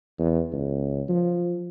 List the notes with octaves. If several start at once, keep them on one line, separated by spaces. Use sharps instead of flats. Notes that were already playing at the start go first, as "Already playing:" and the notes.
E2
C#2
F3